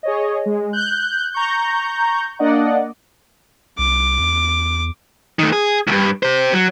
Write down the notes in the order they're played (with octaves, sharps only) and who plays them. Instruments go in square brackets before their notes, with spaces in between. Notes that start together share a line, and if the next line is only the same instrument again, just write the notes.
[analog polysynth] G#4 C#5 D#5
G#3
F#6 G6
A#5 C#6 G6
A#3 D4 D5 D#5 F#5
[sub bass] C2 [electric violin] D6
[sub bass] E2
[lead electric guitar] D#3 A3
G#4
C#2 G2
G4 C5
F#3